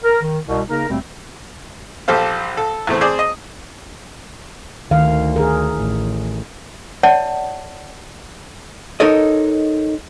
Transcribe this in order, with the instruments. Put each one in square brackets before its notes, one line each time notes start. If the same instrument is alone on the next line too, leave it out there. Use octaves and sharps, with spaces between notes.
[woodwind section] A#4
D#3
C2 B2
C#3 A#3 D#4 A#4
D#2 B2 G3 A3 C4
[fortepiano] A#1 G4 A4 C5 F5
A4
E2 A2 A3 C4
C4 G#4 C5 D5 D#6
D#5
[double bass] D2 [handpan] D#3 F5
[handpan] G#4 A#4
[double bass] A1
[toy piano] C#5 D5 E5 F#5 A5
[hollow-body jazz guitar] D#4 A4 A#4 C#5 D#5